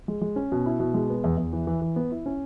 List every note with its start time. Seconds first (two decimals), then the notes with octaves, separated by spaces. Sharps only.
0.08 G#3
0.22 G#3
0.36 C#4
0.52 B2
0.66 E4
0.80 B2
0.94 G#3
1.10 B3
1.24 E2
1.38 E2
1.53 E3
1.67 E3
1.82 E3
1.96 B3
2.11 E4
2.26 C#4